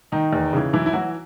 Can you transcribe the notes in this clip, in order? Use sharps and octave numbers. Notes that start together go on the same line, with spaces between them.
D#3 D#4
E2
C#3 E3
F#2 E3 E4
E4
E3 F#3 F#4